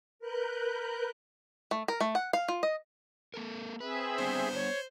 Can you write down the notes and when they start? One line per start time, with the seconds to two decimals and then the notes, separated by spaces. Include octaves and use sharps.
0.19 A#4 B4 F#6 G6
1.71 A3
1.88 A#4
2.00 A3
2.15 F#5
2.33 F5
2.48 F4
2.63 D#5
3.34 A#3 A4 A#4
3.80 C4 G#4 B4 E5
4.18 G3 B3 D4 C5
4.55 C#5